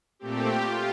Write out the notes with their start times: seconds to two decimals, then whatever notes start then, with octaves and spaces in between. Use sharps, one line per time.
0.19 A#2 A3 C4 G4
0.61 F4